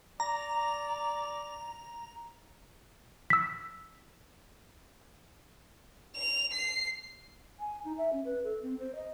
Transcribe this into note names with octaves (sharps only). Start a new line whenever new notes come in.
D5 A#5
E6 B6
F7
C7
G#5
D#4
E5
C#4
B4
A4
C4
C5
D#5